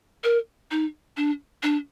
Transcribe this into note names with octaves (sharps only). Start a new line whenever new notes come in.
A#4
D#4
D4
D4